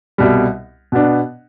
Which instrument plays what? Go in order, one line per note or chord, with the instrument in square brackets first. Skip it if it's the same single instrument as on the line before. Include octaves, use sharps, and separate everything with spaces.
[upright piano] C2 B2 G3
B2 B3 D4